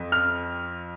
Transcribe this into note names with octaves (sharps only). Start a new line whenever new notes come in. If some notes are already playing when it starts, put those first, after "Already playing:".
Already playing: F2 C4
F6